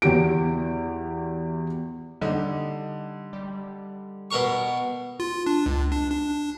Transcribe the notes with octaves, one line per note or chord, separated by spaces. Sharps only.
E2 E3 F#4 G4 D7
D3 G3 D#4
G3
B2 A#4 C#6
F4
D4
C#2
D4
D4
D4